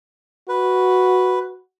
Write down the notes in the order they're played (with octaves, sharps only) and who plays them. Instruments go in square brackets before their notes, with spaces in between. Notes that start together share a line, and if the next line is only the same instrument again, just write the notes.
[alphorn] F#4 [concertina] B4